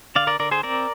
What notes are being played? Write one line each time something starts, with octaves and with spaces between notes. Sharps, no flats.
D3 D5 F5
A#4 D5
D3 A#4 D5
G#4 C5
C4 A#4 D5